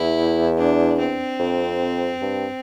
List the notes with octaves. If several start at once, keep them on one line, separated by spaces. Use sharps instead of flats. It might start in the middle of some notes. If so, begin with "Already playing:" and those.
Already playing: E2 E4
D4
C4
F2
G2